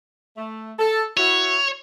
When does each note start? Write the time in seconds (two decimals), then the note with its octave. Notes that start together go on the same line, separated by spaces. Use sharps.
0.37 A3
0.78 A4
1.17 E4 F#4 C#5